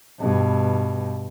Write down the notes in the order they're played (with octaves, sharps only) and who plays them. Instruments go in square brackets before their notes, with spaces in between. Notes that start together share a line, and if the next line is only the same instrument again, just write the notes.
[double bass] G2 B2